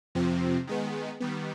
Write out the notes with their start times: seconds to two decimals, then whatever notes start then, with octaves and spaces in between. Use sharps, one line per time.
0.15 F2 C3 F3 C4
0.67 D#3 G#3 B3
1.20 D#3 G3 B3